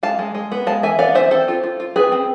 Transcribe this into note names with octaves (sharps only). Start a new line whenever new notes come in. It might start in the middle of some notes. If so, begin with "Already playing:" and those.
G#3 F5 A5
G#3
G#3
B3
G#3 F5 A5
E3 E5 G#5
B3 D5 F5
E3 C5 E5
C4 A4 C5
F4
F4
F4
C4 G#4 B4
C4